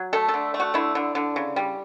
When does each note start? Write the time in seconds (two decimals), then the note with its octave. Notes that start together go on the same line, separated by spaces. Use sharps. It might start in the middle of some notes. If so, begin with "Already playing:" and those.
Already playing: F#3
0.13 A3 A4
0.28 A4
0.34 D3
0.54 A3
0.60 F#4
0.74 D3 E4
0.95 D3
1.15 D3
1.36 C#3
1.56 G3